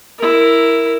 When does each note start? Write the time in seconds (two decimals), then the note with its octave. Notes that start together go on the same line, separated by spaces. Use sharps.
0.18 E4 A#4